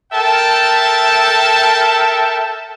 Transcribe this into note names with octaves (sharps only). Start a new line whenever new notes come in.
A4 A#4 E5 G5 A5